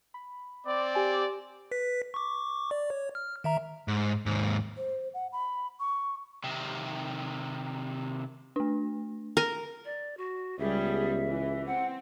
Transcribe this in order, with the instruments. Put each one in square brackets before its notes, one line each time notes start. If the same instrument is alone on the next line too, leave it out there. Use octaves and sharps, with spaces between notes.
[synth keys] B5
[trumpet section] C4 D5
[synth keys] G4 G#5
[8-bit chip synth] B4 B6
C#6 D6
D5
C#5
F6
D#3 E5 A#5
[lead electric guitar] G#2
D#2 G#2
[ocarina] C5
F#5
B5
C#6
[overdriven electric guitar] C3 D#3
[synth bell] A3 D4
[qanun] A#4
[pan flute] D5
F#4
[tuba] C#2 [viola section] G3 B3 G#4 [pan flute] E5
[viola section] E3
[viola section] C4 [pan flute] F#5